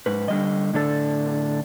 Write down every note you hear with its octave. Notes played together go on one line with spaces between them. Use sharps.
G#2 B4
D3 G3 D#5
A2 D3 D4 A4